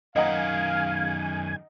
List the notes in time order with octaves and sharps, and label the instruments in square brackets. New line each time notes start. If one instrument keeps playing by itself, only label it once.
[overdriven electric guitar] F#2 D#3 [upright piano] D#5 F#5 A#5 [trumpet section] F5 [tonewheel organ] G#5